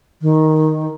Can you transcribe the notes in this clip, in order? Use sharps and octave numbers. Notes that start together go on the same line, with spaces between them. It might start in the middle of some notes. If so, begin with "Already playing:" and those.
D#3